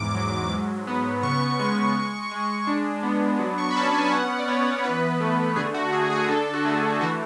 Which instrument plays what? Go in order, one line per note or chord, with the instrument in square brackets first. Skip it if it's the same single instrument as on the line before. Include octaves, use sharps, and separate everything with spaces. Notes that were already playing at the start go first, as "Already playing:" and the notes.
Already playing: [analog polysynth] E2 G#2 D6
F#3
G#2
B3
C#3 C#6
G#3 C#6
G#3
G#3
D4
B3
F#3
C#6
B5
C#4 A5
G#5
G#5
B3 F#5
D5
B3 C#5
E3 B4
A3
D3 G#4
F#4
D3 G#4
G#4
D4 A4
F#4
A3 G#4
E3 F#4